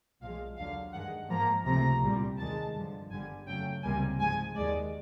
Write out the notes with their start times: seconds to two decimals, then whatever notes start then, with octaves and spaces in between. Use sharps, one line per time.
0.21 B1 A#2 F3 G#3 F5
0.56 D#2 D3 F#3 F5
0.92 G2 D#3 G#3 F#5
1.29 G#2 F3 A#3 A#5
1.65 C#2 C3 F3 A3 A#5
2.02 C2 A#2 G3
2.37 D#2 D#3 G#3 A5
2.74 G2 D3 F3
3.10 G1 G2 D3 G3 G#5
3.46 F2 C#3 F#3 A3 G5
3.82 C#2 C3 D#3 G3 A#3 G#5
4.18 G#2 F3 G#3 G#5
4.55 D#2 D#3 G#3 D5